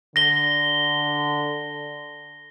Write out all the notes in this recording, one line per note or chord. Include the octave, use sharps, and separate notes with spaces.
D3 A#6 G7